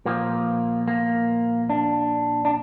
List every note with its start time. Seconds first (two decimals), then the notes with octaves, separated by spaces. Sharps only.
0.06 A#2 F3 A#3
0.88 A#3
1.70 D4
2.45 D4